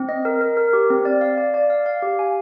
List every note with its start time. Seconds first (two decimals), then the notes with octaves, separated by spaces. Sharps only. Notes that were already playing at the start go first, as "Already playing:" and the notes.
Already playing: C4
0.09 D#5
0.25 A#4
0.41 A#4
0.57 A#4
0.73 G4
0.90 C4
1.05 D5
1.21 F5
1.38 D5
1.54 D5
1.70 F5
1.86 F5
2.02 G4
2.19 G#5